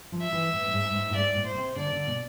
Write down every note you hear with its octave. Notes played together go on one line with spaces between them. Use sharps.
F3
E5
E3
A2
A2
G#2
G#2
A2
G#2 D5
A2
C5
C3
D3 D5
D3
B2